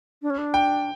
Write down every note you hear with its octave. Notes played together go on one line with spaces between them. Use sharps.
D4
C#4
D4
G5